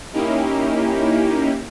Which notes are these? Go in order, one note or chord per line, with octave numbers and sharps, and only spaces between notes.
A#3 C#4 D#4 E4 G4